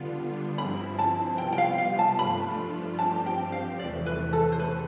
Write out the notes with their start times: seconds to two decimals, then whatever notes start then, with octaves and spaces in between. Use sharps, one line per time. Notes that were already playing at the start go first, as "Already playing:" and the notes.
Already playing: D3 G3 B3 D4 F4
0.58 G2 F3 C4 E4 B5
0.99 A5
1.38 C3 G3 B3 F4 G5
1.53 G5
1.58 F5
1.78 F5
1.99 A5
2.19 G2 F3 A3 D4 F4 B5
2.99 G2 F3 C4 G4 A5
3.26 G5
3.52 F5
3.79 E2 C3 E3 A3 D5
4.06 B4
4.33 A4
4.52 C5
4.59 B4